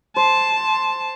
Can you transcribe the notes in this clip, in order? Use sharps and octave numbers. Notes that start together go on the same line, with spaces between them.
C5 A5